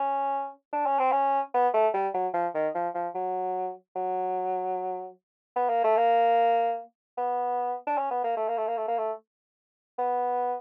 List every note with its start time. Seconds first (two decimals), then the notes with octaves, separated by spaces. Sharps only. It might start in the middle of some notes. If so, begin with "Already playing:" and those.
Already playing: C#4
0.73 D4
0.86 C#4
0.99 C4
1.12 C#4
1.54 B3
1.74 A3
1.94 G3
2.14 F#3
2.34 F3
2.55 D#3
2.75 F3
2.94 F3
3.15 F#3
3.96 F#3
5.56 B3
5.69 A#3
5.84 A3
5.97 A#3
7.17 B3
7.87 D4
7.97 C#4
8.11 B3
8.24 A#3
8.37 A3
8.48 A#3
8.58 A3
8.67 A#3
8.77 A3
8.88 A#3
8.98 A3
9.98 B3